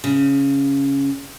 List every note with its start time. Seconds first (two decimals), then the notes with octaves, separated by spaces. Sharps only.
0.04 C#3